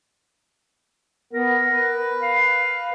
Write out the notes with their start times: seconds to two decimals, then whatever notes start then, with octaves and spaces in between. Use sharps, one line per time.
1.33 B3 A#4
1.71 B4
2.22 F5